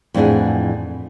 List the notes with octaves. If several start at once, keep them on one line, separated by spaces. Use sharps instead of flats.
F2 A2 E3 D4 G#4 F#5